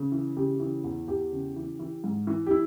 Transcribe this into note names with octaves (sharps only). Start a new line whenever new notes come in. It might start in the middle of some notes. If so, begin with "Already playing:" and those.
Already playing: C#3
E3
C#3 G4
E3
E2
E2 G4
C#3
E3
E3
G#2
E3
G4
E4